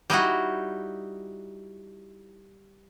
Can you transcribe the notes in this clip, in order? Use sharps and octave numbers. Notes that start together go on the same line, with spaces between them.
G3 D#4 E4 F#4